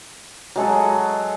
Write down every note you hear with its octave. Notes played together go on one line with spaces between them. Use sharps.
F#3 G#3 A4